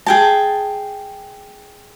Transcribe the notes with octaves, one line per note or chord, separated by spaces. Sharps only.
G#4 G5 A5